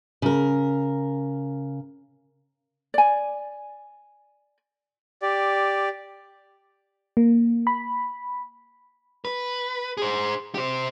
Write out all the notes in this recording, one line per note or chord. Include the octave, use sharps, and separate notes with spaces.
C#3 A#4
D5 G#5
G4 D5
A#3
B5
B4
G#4 C5
G4 C5